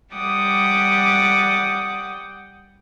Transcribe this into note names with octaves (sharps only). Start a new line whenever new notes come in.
G3 F#5 G5 D6 D#6